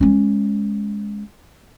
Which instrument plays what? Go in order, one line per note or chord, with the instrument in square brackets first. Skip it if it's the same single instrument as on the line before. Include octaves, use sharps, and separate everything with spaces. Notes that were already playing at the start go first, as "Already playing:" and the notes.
[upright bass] G#3 C#4